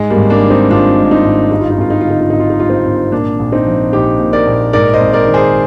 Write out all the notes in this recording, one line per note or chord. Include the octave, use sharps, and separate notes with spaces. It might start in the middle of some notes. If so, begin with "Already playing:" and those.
Already playing: G#2 G#3
G3 A#3
G#1
A#3 D4
D#3
C4 D#4
G#1 D4 F4
G#2
C4 D#4
G#1
G2 D#4
F4
D#4
G#1 F4
D#4
D3 F4
D#4
F4
G#1 D#4
F4
D#4
G2 F4
C4 D#4
G#1
A#2 A#3 D4
A#1
C4 D#4
F3
A#1 D#4 G4
A#2
A#4 D5
A#1
G#2 A#4 D5
C5 D#5
G#1
A#4 D5
D#3
G#4 C5